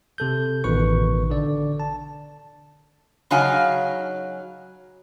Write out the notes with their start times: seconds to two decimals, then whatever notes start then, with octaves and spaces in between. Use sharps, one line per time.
0.18 C3 A4 G6
0.64 A1 B2 D#3 B4 C#6
1.30 D3 D5
1.80 A5
3.31 C#3 F#3 D#4 F5 G#5